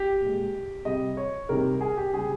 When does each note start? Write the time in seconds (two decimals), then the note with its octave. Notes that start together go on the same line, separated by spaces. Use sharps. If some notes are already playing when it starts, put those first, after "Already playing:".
Already playing: G4
0.21 A#2 G#3
0.85 C3 G3 D#5
1.17 C#5
1.49 C3 D#3 G3 A#4
1.81 G#4
1.97 G4
2.13 C#3 G3 G#4